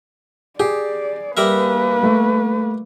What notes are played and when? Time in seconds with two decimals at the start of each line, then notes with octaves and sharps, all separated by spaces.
0.60 G4 G#4 D5
1.37 G3 A#3 A#4 B4 E5
2.03 A3